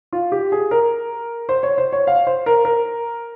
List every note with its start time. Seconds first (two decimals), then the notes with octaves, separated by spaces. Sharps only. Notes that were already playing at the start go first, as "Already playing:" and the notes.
0.13 F4
0.32 G4
0.52 G#4
0.71 A#4
1.49 C5
1.63 C#5
1.78 C5
1.93 C#5
2.07 F5
2.27 C5
2.46 A#4
2.65 A#4